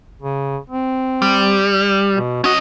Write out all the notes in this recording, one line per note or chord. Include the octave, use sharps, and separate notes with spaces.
C#3
C4
G3
B2
C#4 F#4 D#5